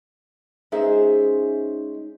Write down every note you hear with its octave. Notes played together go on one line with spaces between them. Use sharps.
G#3 C#4 D#4 G#4 C5 E5